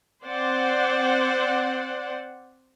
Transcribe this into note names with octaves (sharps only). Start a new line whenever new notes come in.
C4 C5 D5 F#5